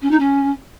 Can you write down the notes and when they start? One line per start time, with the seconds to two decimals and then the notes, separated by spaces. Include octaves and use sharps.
0.02 C#4
0.10 D#4
0.19 C#4